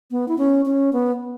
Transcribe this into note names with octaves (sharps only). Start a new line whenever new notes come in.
B3
E4
C#4
C#4
B3